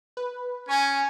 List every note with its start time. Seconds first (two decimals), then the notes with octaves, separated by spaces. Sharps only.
0.17 B4
0.69 C#4 G#5 C#6